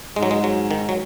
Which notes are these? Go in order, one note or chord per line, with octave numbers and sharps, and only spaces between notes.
G#2 G#3
F#3
G#3
F#3
D#3
F#3